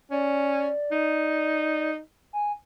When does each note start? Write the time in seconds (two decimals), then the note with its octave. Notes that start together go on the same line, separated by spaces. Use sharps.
0.11 C#4 D5
0.92 D#4
2.33 G#5